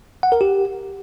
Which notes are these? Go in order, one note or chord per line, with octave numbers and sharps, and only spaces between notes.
F#5
A#4
G4